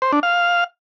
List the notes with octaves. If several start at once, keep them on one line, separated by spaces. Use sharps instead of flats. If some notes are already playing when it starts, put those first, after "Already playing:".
C5
D4
F5